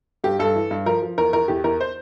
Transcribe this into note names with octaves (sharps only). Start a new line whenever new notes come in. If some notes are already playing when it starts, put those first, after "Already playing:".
G2 G4
G2 A4
E3
G2
F3 A#4
F3
E2 A#4
E2 A#4
E2 G4
E2 A#4
C5